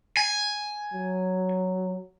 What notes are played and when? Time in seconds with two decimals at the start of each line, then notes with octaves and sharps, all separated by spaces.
0.17 G#5
0.93 F#3